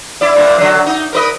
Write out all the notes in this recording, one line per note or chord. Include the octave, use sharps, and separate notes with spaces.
E4 D5
G2 A#2 E4
D3 F#3
D#4
A#4 B4 D#5